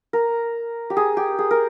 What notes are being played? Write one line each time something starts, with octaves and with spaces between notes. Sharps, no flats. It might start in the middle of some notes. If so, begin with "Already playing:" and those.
A#4
G4
G#4
G4
G#4
A#4